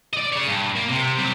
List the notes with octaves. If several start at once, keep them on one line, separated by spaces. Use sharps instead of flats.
D5 D#5
G#4 C#5
G2
A#3
C3
F#3 G3